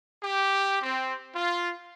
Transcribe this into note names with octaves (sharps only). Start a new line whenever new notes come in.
G4
C4
F4